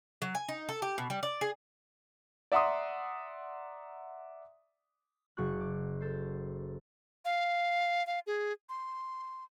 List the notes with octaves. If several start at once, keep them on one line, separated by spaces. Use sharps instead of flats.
F#3
G#5
D#4
A4
G4
B2
G3
D5
G#4
D5 E5 F#5 A#5 C6 D#6
F#1 F#4 C#6 F#6
D6
A4 C5
F5
F5
G#4
C6